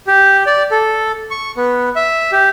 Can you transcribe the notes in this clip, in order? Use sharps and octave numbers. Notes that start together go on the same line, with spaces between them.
G4
D5
A4
C#6
B3
E5
G4